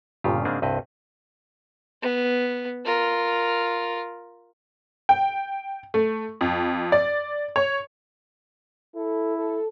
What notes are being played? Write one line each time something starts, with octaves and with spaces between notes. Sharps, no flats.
G1 G2 A#2 C#3 F4 G4
G#2 C#3 A#3 C4 D4 G#4
C2 G2 C4 B4 D#5
B3
F4 A#4
G5
A3
F2
D5
C#5
E4 A4
A4